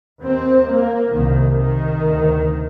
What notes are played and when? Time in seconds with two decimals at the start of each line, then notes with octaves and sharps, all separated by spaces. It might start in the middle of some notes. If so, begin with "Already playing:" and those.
0.22 D#2 C4
0.68 A#3
1.13 C2 C3 D#3
1.59 D#3
2.05 D2 C3